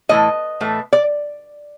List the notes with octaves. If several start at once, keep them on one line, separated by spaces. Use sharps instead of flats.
A2 E3 A3 D#5
A2 E3 A3
D5